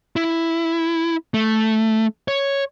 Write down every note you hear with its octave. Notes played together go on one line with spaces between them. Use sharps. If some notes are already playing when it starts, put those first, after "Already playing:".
E4
A3
C#5